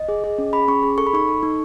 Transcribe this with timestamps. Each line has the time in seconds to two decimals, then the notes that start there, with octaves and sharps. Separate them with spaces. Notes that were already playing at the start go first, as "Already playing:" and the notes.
Already playing: D#5
0.08 G#4
0.24 G#4
0.38 C#4
0.53 G#4 B5
0.68 C#4 C#6
0.83 G#4
0.98 A4 C#6
1.07 B5
1.13 D#4 C#6
1.28 A4
1.43 D#4